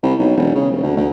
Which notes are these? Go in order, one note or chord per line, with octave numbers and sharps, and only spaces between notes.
C2
B1
E1
C#3
F1
D2
D2